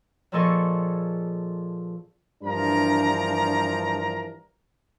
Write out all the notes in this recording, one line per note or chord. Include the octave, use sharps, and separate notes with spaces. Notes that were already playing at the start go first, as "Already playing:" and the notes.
A#2 F3 G#4 A4 D#5 C#6
G2 E3 F3 D4 A#4 A#5